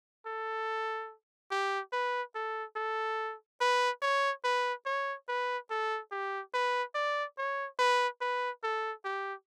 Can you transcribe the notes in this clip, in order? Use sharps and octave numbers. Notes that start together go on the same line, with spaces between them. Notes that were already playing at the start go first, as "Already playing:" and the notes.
A4
G4
B4
A4
A4
B4
C#5
B4
C#5
B4
A4
G4
B4
D5
C#5
B4
B4
A4
G4